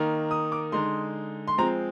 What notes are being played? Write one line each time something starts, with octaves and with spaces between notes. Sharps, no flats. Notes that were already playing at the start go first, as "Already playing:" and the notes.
Already playing: D#3 A#3 D#4
D#6
D6
D3 G#3 D#4 C6
C6
F3 G#3 C4 A#5